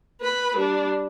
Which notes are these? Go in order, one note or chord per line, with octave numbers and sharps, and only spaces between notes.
B4 B5
G3 D4